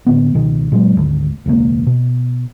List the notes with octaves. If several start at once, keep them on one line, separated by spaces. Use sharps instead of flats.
A2 D3 B3
C#2 B2 D#3
A#2 F#3 G#3
G#1 D2
E1 C#2 D#3 A#3
B2